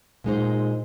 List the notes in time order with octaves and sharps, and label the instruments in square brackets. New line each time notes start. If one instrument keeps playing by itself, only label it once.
[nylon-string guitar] A#2 G#3 D#4 C5